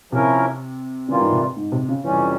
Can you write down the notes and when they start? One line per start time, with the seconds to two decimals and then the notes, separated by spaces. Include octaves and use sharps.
0.12 C3 F3 A#3 C#4 E4 A#4
1.08 C#3 E3 G3 A#3 F4
1.20 G#2
1.32 C3
1.57 G#2
1.72 C3
1.89 C#3
2.04 F2 C3 E3 G3 C#4